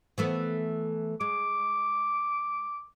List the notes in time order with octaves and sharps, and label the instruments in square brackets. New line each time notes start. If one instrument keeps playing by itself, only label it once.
[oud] E3 A3 B3
[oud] G#3 [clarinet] D6